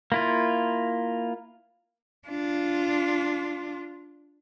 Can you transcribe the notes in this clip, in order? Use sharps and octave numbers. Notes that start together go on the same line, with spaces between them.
A#3 E4 F4
D4 F4